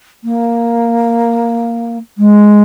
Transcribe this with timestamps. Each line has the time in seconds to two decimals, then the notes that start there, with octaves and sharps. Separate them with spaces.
0.24 A#3
2.18 G#3